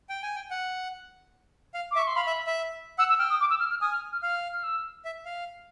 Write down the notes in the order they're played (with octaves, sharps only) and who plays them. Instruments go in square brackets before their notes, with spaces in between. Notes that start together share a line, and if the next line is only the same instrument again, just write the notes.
[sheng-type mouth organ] G5
G#5
G5
F#5
F5
[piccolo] D6
[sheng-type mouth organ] E5
[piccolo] C#6
C6
[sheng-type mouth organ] F5 [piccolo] B5
[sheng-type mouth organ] E5
E5
[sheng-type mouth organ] F#5 [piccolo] E6
[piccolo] E6
[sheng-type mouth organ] G5 [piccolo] F6
[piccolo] D#6
D6
E6
F6
F6
[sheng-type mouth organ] G#5 [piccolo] D#6
[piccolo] F6
F6
[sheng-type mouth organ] F5 [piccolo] F6
[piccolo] F6
E6
[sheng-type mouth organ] E5
F5